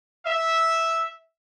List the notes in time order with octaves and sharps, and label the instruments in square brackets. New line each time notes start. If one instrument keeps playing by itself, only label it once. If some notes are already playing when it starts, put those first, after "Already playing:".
[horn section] E5